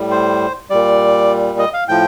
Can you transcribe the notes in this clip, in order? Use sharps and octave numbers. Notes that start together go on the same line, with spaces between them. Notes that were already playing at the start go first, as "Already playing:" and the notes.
Already playing: A2 G3
C5
A#2 G3 D5
D#5
F5
A2 F3 G5